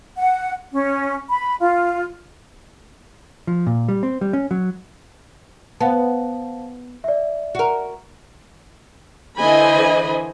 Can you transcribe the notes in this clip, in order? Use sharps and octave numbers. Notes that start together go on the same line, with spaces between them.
F#5
C#4
B5
F4
F3
A#2
G3
C4
G3
C#4
F#3
B3 C5 F5 A5
D5 E5
F#4 A#4
D3 E3 C5 D#5 G#5 B5